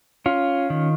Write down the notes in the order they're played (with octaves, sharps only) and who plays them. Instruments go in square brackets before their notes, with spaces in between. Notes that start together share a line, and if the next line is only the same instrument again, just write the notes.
[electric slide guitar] C#4 F4
D#3